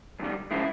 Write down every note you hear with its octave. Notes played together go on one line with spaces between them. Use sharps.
F#2 D#3 G3
C#3 F3 G#3 E4